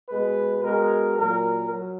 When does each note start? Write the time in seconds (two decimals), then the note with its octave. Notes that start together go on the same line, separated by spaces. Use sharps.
0.08 B2 G#3 B4
0.62 B2 G#3 A#4
1.16 A#2 F#3 A#4
1.70 F#3